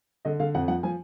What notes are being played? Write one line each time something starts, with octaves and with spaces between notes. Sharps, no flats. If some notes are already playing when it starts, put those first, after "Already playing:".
D3 D#5
D3 F5
F2 F#5
F3 F#5
F3 G#5